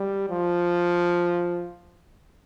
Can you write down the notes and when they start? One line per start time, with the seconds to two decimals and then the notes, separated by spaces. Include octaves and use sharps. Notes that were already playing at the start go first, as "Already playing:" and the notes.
Already playing: G3
0.30 F3